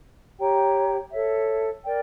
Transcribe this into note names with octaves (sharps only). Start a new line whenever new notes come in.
G4 C#5 G5 A#5
A4 C#5 E5
A#4 D5 G5